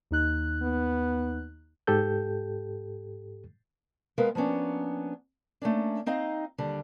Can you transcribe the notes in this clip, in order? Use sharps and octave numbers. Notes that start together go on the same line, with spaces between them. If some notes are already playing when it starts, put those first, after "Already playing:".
D#2 D#4 F#6
B3
G#2 G4 A4 G6
G#3 B3 A#4 B4 F5
F3 A#3 B3 C#4 D4
A3 A#3 C#4 D4
C4 D#4 D#5 F5
D#2 D3 G3